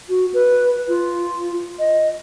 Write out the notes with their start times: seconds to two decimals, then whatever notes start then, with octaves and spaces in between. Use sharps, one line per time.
0.09 F#4
0.34 B4
0.88 F4
1.79 D#5